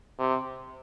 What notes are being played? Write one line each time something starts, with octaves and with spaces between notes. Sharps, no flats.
C3